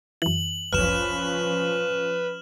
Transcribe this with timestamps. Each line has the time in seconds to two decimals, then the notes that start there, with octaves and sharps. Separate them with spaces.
0.22 F#2 E3 F#7
0.73 G1 C#2 F#2 F3 C#4 B4 F6 E7